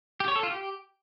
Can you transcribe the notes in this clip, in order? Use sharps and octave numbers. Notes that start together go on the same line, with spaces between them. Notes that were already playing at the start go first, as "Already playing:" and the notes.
G4
C#5
A4
F4
G4